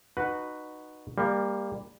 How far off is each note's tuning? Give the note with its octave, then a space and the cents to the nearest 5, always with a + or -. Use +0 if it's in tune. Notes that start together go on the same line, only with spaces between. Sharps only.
D#4 -25 F#4 +0 B4 +0
G3 +25 A#3 +0